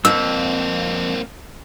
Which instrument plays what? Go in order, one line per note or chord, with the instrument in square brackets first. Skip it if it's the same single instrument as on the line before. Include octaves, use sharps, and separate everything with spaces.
[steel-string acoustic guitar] F2 [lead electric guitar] A#3 C4 [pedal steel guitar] E6